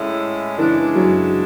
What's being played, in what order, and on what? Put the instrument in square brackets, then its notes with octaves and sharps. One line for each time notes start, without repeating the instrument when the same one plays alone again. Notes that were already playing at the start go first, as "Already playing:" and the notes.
Already playing: [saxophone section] A2 G#3 C#4 E4
[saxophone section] C#3 G#3 D4 [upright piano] E3
[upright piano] F#3